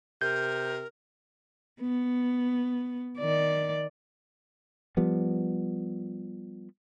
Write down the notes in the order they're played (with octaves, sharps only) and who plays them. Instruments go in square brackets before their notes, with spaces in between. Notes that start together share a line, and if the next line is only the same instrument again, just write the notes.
[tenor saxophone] C3 [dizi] A#4 [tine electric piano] G6
[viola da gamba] B3
D#3 D5
[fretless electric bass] F3 G3 B3